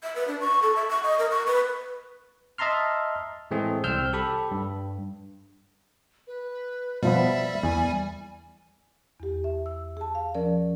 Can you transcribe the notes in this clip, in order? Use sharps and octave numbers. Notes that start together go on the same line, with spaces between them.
E5
B4
D4
C#6
A4
E5
C#6
D#5
A#4
C#6
B4
D#5 E5 A5 A#5 C6 F6
A2 E3 G#3 A3 C4 G#4
C2 C4 E6 F6 G6
G4 A4 B5
G2
B4
B2 F3 G3 B3 E5
E2 G#5
E2 G4
E5
E6
G#4 A5
F5
F3 C#4 A#4 D5